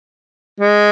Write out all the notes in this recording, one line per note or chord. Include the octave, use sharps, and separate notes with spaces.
G#3